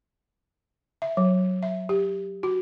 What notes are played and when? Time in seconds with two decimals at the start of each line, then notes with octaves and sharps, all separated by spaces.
1.02 E5
1.17 F#3
1.63 E5
1.89 G4
2.43 F#4